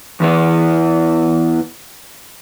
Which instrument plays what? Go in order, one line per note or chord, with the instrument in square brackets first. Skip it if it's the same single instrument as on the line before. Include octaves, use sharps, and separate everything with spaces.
[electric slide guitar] E2 E3 B3